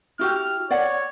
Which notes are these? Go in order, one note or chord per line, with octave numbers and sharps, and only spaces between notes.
E4 F#4 G4 F6
C#5 D5 F#5